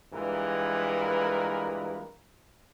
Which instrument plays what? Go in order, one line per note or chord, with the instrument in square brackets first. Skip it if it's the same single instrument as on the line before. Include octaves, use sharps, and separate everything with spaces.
[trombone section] G2 A#2 E3 G#3 A#4 B4